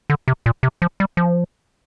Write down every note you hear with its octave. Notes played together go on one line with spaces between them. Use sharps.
D3
C3
A#2
C3
F3
G3
F3